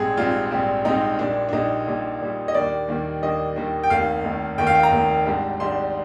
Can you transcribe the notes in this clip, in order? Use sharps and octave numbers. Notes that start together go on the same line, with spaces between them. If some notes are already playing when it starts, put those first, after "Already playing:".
Already playing: A#1 G#2 G3 C4 G#4
A#1 G#2 G3 C4 F4
A#1 G#2 G3 C4
A#1 G#2 G3 C4 D#4
A#1 A#2 G3 D4
D4
A#1 A#2 G3 D#4
A#1 A#2 G3
A#1 A#2 G3
D#5
D#2 D#3 G3 A#3 D4 D5
D#2 D#3 G3 A#3 D4
D#2 D#3 G3 A#3 D4 D#5
D#2 D#3 G3 A#3 D4
G5
F1 D#2 D#3 F5
F1 D#2 D#3
F1 D#2 D#3 G5
F5
G5
A#5
F1 D#2 D#3
G#1 G#2 G3 D4
G#1 G#2 G3 D4 C6